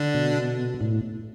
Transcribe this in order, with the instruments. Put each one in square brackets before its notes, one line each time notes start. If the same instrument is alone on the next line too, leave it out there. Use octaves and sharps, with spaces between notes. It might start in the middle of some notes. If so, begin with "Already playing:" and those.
Already playing: [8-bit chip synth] D3 D4
[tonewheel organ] B2
A2